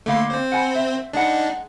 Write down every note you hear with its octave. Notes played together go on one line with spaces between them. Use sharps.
D3 A3 A#3 F5 C6
C4 C5
F#5 G#5
E5
G#3 D4 D#4 F#5